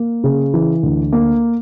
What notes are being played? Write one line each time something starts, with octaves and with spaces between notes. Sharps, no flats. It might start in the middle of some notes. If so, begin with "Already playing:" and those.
Already playing: A#3
C#3
E3
D2
A#3